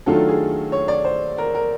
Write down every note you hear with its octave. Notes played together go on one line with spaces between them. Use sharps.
D#3 F#3 A3 D4 F4 A4
G#4
C#5
D5
C5
A#4
A#4